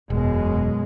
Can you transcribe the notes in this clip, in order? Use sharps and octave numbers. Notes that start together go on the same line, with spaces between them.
E1 F#2 B2 G#3